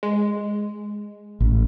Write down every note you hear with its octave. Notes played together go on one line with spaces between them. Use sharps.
G#3
A1